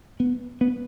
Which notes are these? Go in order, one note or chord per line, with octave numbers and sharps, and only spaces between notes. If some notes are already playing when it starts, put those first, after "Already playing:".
B3
B3